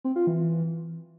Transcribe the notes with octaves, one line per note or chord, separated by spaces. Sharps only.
C4
F4
E3